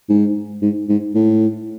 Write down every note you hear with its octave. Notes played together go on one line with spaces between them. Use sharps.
G#2
G#2
G#2
A2